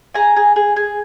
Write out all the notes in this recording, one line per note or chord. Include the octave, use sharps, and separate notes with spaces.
G#4 G#5 A#5
G#4
G#4
G#4